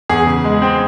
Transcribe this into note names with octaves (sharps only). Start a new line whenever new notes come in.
E2 G#4
C#3
G#3
C4